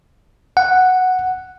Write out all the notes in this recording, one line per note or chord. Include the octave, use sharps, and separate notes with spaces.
F#5